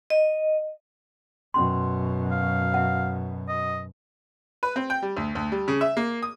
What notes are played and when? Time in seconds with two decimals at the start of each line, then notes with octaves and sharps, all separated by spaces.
0.10 D#5
1.54 F#2 B2 C#4 C6
2.32 F5
2.74 E5 F#5
3.49 D#5
4.63 B4
4.76 C4
4.90 G5
5.02 G3
5.17 D2
5.35 D2
5.52 G3
5.68 C#3
5.81 E5
5.97 A#3
6.23 D#6